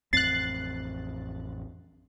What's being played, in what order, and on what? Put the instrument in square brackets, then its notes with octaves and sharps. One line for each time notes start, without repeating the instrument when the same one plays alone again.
[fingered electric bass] A1 F2 C4 [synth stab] F#6 A6 [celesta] C7